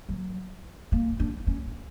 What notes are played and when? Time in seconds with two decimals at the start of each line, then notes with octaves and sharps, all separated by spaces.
0.09 F#3
0.92 A#3
1.20 D4
1.47 C#4